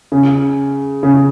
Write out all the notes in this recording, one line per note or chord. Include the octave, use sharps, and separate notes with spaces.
C#3
C#3